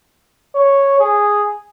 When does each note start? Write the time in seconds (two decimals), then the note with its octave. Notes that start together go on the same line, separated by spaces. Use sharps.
0.55 C#5
0.99 G#4